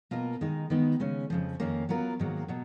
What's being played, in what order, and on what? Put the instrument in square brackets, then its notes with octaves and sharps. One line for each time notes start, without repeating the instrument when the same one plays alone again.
[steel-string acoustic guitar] B2 A#3 F4 A#4
D#3 G#3 D#4
D#3 G#3 B3 D#4
C#3 G#3 C#4
F2 C#3 F3
F2 D#3 A#3 C#4
F#3 B3 F4 A#4
G#2 D#3 F#3 A#3
B2 F#3